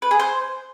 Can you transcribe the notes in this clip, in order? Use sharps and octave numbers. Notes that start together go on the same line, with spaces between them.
B4
G#4
C5